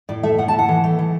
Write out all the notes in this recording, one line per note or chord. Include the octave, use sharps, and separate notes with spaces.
A2 D5
A3 E5
A2 F#5
A5
A2
F#5
E3
A3
E3